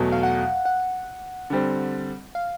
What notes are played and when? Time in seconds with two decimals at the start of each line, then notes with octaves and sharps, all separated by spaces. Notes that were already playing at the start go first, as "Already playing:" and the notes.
Already playing: E2 B2 F#3 A3
0.12 F5
0.23 F#5
0.65 F#5
1.50 D3 G3 C4
2.35 F5